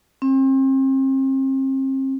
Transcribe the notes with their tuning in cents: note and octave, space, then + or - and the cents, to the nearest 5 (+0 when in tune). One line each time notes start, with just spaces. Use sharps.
C4 +40